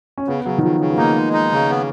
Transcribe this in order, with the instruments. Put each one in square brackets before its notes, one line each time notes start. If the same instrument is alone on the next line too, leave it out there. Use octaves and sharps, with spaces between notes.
[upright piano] C#4
[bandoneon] C#3 [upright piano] B3
[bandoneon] C#3 [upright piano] F#3
[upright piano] D#3
[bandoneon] C#3 [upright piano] F3
[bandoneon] C#3
[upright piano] B3
[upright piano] A#3 [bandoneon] D#4
[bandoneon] G#3
D#4
C#3
B3